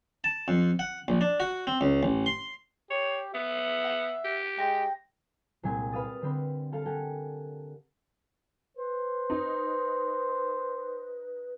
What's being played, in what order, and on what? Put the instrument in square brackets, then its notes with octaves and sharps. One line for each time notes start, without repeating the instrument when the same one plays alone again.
[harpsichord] A5
F2
F#5
A#1
D4
F#4
C4
C#2
A1
C6
[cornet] G4 [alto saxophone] C#5
[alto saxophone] B3 [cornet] E5
[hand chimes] F#5
[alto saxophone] G4
[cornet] G#3 [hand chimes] G5 A#6
[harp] C2 A#2 G#3 G4 G#5
B4 F5 D#6 A6
D3 C4 G4 B4
A4 F5 A5
G4 A4 A#4 F#5 G#5
[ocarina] B4 [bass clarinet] C5
[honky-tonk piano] D#4